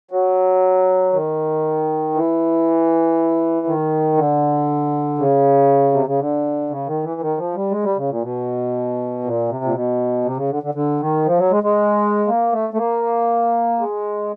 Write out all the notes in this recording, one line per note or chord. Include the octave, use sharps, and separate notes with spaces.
F#3
D#3
E3
D#3
D3
C#3
C3
C#3
D3
C#3
D#3
E3
D#3
F3
G3
G#3
G3
C#3
A#2
B2
A#2
C3
A#2
B2
C3
C#3
D3
D3
D3
D#3
F3
F#3
G#3
G#3
A#3
A3
A3
A#3
G#3